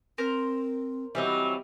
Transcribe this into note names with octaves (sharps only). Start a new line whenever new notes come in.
C4 A#4 C5
E3 F#3 G3 C4 D#5